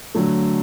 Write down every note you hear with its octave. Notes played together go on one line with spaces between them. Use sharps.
D3 F#3 A3